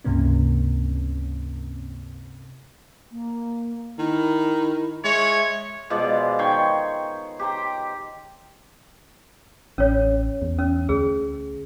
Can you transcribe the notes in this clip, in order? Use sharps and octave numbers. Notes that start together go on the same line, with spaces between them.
C#2 G2 C3 A#3 C#4
A#3
D#3 E4
G#3 C#5 E5
B2 F3 G#3 D5
D#3 C#5 G5 C6
G4 C5 A#5
A1 C#4 C#5
E2
C#4
D2 G#4